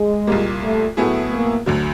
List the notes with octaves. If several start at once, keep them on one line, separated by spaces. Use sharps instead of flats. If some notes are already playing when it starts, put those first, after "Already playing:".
Already playing: G#3
C2 A#2 G3 A#3
A3
A2 F#3 A3 B3 E4 G#4
A#3
D2 D3 F#3